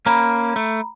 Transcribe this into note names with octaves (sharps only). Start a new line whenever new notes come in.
A#3 C#4 A#5 B5
A3